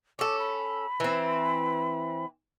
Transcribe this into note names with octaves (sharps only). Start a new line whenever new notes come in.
C#4 A4 D6
B5
E3 C4